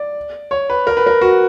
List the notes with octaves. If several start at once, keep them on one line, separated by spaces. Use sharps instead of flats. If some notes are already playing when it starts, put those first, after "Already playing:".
Already playing: D5
C#5
B4
A#4
B4
A#4
F#4